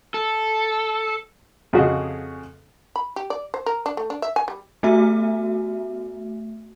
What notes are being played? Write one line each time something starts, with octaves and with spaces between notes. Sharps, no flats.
A4
F2 C#3 F#4 G#4 D#5
B5
G4
D5
C5
A#4
D4
A3
D4
E5
G#5
G3
A3 B3 F#4 E5